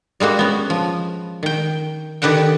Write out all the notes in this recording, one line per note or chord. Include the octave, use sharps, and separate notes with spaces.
G3 G#3 A#3 F#4
B3 C#4
F3
D#3 G5
D3 D#3 G4 B4 F#5 G5